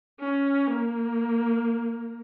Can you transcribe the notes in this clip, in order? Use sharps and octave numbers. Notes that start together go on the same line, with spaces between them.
C#4
A#3